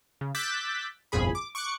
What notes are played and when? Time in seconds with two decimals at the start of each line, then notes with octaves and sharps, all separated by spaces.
0.21 C#3
0.35 D6 E6 F#6 G6 A6 B6
1.12 G1 C2 F2 A#2 G#4 B5
1.35 D6
1.55 C#6 D6 F#6 C#7